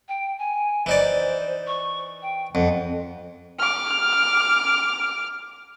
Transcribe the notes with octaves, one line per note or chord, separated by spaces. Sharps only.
G5
G#5
E3 D#4 C5 D5
C#6
G5
F2 F#5
D6 F6